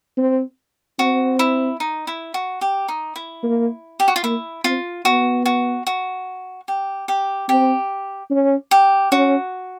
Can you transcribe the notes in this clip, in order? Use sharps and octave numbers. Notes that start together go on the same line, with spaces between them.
C4
C4 F#4
E4
D#4
E4
F#4
G4
D#4
E4
A#3
G4
F#4
F4
A#3 E4
C4 F4
B3 F#4
F#4
F#4
G4
G4
C4 G4
C#4
G4
C#4 F#4